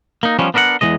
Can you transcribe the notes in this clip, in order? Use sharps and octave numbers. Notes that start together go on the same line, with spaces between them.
A#3 D#4
F3 G3 B3 C#4
B3 D4 A#4 D#5 F#5
E2 A#2 E3 G#3 D#5